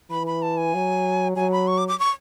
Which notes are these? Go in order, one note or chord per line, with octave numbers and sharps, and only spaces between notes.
E3 B5
B5
A5
G#5
F#3
F#3 G#5
B5
C#6
D6
D6
C#6